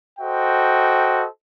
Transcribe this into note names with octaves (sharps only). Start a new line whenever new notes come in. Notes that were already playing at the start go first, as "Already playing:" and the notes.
F#4 A4 C5 D#5 G5